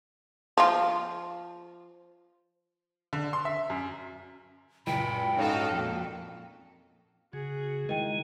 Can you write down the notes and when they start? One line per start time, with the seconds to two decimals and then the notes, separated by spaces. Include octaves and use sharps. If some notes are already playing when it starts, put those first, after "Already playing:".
0.58 F3 F4
3.13 D3
3.33 C6
3.45 E5
3.70 F#2
4.87 C#2 F#2 A#2 G5 B5
5.38 G#2 C#4 D#4 F#4 A4 F5
5.72 F2 A#2
7.33 C#3 F#4 G#4
7.89 D#3 G#3 E4 A#4 D#5 G5